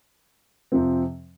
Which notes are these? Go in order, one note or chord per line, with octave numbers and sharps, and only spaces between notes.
F2 C3 F3 C4